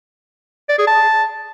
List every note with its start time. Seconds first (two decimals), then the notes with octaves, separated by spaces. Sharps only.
0.69 D5
0.78 G#4
0.87 A5